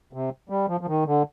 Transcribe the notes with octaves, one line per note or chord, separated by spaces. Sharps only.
C3
G3
F3
F3
D#3
D3